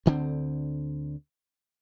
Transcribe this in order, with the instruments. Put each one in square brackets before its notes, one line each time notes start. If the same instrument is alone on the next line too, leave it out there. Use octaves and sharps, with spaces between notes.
[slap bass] D2 D3 A#3 C4